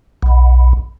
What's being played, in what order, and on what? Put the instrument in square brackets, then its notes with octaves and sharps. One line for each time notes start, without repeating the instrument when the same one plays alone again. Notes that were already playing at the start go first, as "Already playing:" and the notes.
[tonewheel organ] B1